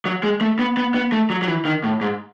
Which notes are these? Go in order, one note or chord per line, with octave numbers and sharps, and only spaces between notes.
F#3
G#3
A3
B3
B3
B3
A3
F#3
F#3
E3
D#3
A2
G#2